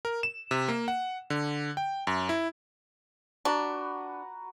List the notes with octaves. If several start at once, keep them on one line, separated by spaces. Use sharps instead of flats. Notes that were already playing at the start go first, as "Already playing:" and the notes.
A#4
E7
C3
A#3
F#5
D3
G5
F#2
E4
D4 F#4 B4 A#5